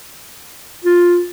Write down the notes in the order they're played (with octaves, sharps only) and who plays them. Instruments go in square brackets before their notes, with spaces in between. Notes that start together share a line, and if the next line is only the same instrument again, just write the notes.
[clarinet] F4